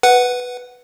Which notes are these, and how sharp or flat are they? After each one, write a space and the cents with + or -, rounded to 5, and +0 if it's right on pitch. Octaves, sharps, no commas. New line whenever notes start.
B4 +0 F#5 +0